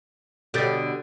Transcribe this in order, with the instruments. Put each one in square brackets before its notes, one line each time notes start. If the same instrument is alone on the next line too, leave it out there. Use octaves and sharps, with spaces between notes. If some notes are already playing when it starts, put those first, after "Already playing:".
[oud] B2 D3 G4 [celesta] A4 G6 A6